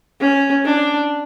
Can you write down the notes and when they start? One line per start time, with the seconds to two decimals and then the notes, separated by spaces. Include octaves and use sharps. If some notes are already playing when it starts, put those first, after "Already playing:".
0.21 C#4
0.65 D4